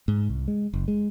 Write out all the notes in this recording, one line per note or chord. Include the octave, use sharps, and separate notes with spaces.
G#2
C2
G#3
F#1
G#3